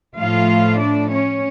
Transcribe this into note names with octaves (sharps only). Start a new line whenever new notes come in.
A2 F3 A3 F4 F5
D4 D5
C#4 C#5